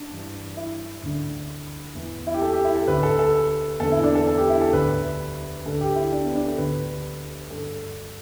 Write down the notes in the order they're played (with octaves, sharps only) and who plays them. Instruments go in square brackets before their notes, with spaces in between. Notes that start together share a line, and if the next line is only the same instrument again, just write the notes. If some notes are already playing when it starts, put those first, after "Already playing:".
Already playing: [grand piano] D4
G2 E3
E4
D2 D3
E2 E3
E4
G4
A4
G4
E4
A4
D2 D3 B4
A4
A4
E2 A4
D3
E4
D4
A4
A4
G4
E4
A4
D2 D3 B4
D2 D3 A4
G4
E4
D4
B3
D4
A4
D2 D3 B4
G2 D3 A4